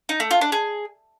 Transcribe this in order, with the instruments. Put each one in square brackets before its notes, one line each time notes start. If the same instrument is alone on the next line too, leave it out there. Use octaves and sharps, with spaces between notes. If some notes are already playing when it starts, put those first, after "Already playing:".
[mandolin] D#4
A3
F4
D4
G#4